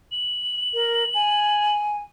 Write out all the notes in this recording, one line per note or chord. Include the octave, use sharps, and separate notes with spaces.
F#7
A#4
G#5